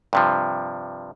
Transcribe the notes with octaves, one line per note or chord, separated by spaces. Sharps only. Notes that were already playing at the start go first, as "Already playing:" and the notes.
G2 C3 F3